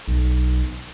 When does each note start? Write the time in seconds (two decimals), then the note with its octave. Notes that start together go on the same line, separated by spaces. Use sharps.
0.07 B1